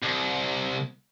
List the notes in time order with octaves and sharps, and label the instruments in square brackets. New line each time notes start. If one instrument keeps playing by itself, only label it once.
[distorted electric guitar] C2